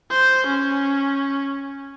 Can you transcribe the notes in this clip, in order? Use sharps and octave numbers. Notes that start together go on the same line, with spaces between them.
C5
C#4